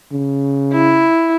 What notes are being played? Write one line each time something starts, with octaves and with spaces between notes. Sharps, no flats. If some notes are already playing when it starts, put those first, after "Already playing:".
C#3
E4